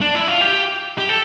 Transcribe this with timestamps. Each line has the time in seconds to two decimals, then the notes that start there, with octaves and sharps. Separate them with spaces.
0.01 D4
0.15 E4
0.28 F4
0.41 G4
0.98 G4
1.09 A4